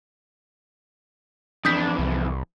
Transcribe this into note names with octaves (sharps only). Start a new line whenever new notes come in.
F2 E3 D4 D#6 G6 B6
C2